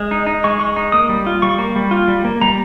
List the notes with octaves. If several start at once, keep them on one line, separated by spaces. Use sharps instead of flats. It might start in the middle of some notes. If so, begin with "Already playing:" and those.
Already playing: G#3
D#4
D#4
G#3 C#6
G#3 C#6
D#4
A#3 D#6
G3
F4
G3 C#6
A#3
G3
F4
G3
A#3
G3 A#5